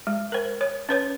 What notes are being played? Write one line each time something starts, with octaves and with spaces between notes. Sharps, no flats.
G#3
A#4 C5
C#5
C#4 B4 C#5